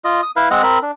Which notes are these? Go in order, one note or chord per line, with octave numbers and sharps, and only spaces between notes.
F4 D#5
D#6
E4 B4 F5
G#3 C4 D#5 F#5
C4 A#4 B5
D4